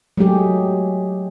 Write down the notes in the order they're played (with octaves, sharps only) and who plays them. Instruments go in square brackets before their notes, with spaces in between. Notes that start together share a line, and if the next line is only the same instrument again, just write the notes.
[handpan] F#3 G#3 A3 G4 G#4